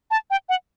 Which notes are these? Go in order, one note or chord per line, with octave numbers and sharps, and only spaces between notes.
A5
G5
F#5